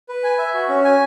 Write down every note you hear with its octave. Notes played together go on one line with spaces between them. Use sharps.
B4
G#5
E5
F#4
C#4
G#5